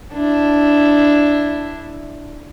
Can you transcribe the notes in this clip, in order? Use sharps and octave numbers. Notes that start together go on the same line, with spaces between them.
D4 E4